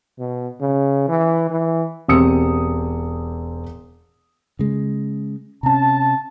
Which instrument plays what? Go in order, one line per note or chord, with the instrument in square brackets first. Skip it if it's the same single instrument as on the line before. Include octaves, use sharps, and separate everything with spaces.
[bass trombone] B2
C#3
E3
E3
[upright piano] E1 C4 G4 D#6 E6 C#7
[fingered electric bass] C#3 G#3
[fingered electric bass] C3 C#4 [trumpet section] A5